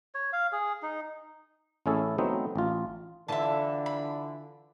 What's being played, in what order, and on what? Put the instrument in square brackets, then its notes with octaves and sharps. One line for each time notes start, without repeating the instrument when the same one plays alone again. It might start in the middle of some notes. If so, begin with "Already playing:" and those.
[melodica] C#5
F5
G#4
D#4
[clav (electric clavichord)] A1 A3 C#4 E4 G#4 A4
F#3 A3 B3 C4 D#4
A1 F4
[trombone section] D3 [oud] E3 E4 F4 [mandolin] E5 A5
[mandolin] B5